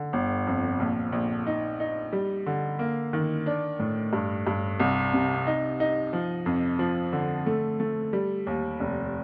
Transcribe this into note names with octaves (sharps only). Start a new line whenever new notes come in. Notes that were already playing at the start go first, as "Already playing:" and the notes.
Already playing: D3
G1
F2
A#1
A#1
D#4
D#4
G3
D3
A#3
D#3
D4
A2
G2
G2
C2
C3
D#4
D#4
F3
F2
F3
D3
A3
A3
G3
D#2
F1